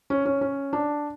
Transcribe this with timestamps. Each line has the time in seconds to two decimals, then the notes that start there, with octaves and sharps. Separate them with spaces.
0.10 C#4
0.25 C#4
0.41 C#4
0.73 D4